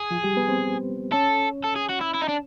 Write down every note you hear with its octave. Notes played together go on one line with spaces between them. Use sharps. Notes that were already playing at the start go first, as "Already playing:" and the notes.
Already playing: G#4
F3 F4
G3 G4
B3 B4
C4 C5
C#4 A4 C#5
A4
G#4
F#4
E4
E4
D#4
D4